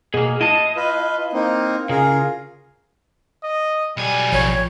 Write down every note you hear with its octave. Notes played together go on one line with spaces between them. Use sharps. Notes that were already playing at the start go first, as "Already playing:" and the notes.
B2 A#3 G#4
E4 D#5 A5
F4 B4
A#3 C4 D#4
C#3 F4 G#4 A#4
D#5
B1 G3 G#5
A1 F3 F4 C#5